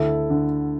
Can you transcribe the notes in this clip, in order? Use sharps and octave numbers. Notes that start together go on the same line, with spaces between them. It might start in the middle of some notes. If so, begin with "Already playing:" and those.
Already playing: D2 E4 A4
D3